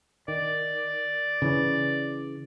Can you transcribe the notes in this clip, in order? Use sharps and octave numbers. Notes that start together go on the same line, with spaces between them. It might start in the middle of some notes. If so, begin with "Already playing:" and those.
D#3 D5
C#3 E3 C#4